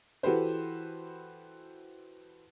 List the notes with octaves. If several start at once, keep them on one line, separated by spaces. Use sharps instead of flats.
E3 F#4 G4 A4 B4 C5